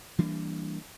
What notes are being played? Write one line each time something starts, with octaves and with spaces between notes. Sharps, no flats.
E3 G3 A#3 D4